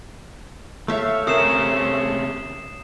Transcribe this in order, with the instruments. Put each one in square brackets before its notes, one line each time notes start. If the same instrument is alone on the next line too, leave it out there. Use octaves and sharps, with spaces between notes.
[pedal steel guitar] A3 [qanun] C#5 E5 F5
[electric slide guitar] C3 C#4 [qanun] A#4 [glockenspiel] D#6 C7 E7